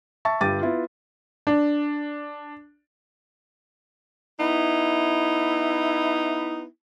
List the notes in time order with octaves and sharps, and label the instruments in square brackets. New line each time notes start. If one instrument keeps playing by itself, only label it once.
[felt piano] E5 A5 C#6 A6
G1 G2 G4 D6 A6 D#7
B3 E4 F4
[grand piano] D4
[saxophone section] B3 D#4 E4